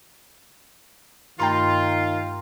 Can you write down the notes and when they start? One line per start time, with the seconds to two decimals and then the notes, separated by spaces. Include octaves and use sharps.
1.40 G2 D#3 A3 F4 G5 A#5 C6 A6